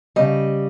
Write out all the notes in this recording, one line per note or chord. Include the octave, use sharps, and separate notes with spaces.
C#3 G3 D#5